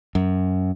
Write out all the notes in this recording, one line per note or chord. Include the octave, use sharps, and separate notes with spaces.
F#2